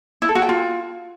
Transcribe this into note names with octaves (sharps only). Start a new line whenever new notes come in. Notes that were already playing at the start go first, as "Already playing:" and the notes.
E4
A4
F#4
G5
F4